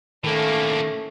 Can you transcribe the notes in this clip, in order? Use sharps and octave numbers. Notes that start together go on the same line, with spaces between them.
A2 D#3 A3 A#3 C#4